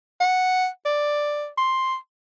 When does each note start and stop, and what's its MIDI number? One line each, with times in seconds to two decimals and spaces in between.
0.20 0.68 78
0.85 1.47 74
1.58 1.95 84